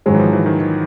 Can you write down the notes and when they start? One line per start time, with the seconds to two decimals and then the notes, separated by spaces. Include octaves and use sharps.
0.06 G#2 D#3 F#3 G#3 C#4
0.15 E3
0.19 F3
0.33 E3
0.46 D#3
0.60 D#3